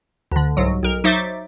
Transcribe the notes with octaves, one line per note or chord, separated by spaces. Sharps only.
D2 D3
C2 G#2 F#3
B1 A#4
F#3 D#4 C5 E5 D6 A6